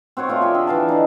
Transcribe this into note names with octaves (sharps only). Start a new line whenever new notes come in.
C4 F#4 C5 C#5
A3 F4 C#5 D5
G#4 E5 G5
D3
E3 F5 A5
D3 D4 D#4